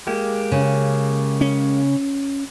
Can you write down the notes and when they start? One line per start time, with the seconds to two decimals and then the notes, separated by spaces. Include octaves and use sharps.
0.07 G#3 A#3 G4
0.52 C#3
1.41 C#4